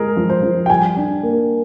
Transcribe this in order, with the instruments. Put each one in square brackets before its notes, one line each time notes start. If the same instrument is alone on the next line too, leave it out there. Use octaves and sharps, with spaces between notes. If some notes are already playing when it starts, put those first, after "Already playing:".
Already playing: [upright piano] G#3 [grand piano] G#4 A#4
[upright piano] F3
[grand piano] C5
[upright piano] F3
[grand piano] G5
[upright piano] G3 [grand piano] G#5
[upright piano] D4
A#3